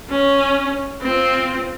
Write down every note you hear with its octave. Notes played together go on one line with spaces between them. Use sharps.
C#4
C4 F4